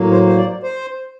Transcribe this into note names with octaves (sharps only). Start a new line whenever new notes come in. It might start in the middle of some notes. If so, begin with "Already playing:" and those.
Already playing: A2 F#3 A#3
C5
C5
D5
C5